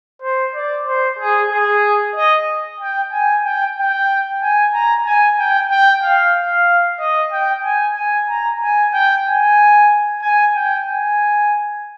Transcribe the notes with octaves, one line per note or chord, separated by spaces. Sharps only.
C5
D5
C5
G#4
G#4
D#5
G5
G#5
G5
G5
G#5
A#5
G#5
G5
G5
F5
F5
D#5
G5
G#5
G#5
A#5
G#5
G5
G#5
G#5
G5
G#5